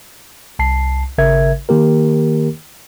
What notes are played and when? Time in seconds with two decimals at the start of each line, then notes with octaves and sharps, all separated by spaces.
0.59 C2 A5 C7
1.18 G#1 C#3 A#4 E5 G#6
1.69 D#3 A#3 G4 A#4